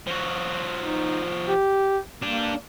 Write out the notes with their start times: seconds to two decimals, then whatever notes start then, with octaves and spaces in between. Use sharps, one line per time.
0.07 F3 F#4
0.80 D#4
1.47 G4
2.22 A#3 D4 G4